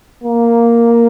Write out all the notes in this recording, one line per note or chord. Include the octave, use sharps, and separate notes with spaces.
A#3